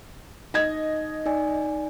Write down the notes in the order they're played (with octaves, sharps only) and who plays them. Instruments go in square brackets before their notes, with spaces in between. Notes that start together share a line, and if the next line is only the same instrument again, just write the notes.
[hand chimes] D#4 [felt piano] D#5 G#6
[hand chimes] D#4 D5 G#5